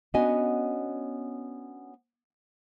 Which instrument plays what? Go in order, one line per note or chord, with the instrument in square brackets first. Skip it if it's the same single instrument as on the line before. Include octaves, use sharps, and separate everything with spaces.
[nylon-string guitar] B3 C#4 D4 F#4 D#5 G#5